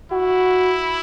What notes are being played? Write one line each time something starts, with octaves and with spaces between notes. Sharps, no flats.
E4 F#4